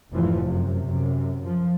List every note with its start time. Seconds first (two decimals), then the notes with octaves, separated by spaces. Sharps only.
0.13 F1 G#2 E3 F3
0.43 F#2 C3
0.85 F#2 C3
1.43 F3